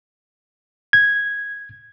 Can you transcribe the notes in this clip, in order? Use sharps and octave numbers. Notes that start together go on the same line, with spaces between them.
G#6